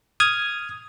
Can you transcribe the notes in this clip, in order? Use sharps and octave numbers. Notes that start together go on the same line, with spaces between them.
D#6 F6 G#6